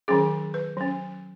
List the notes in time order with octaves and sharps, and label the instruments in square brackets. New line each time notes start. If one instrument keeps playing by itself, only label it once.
[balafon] D#3 F#3 C#4 G#4
B4
F#3 C#4